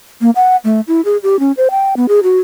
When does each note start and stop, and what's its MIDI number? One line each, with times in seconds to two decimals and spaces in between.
0.21 0.31 58
0.36 0.56 78
0.64 0.81 57
0.88 1.01 64
1.05 1.17 68
1.23 1.39 67
1.39 1.52 61
1.57 1.68 72
1.71 1.94 79
1.97 2.06 59
2.08 2.20 68
2.23 2.40 66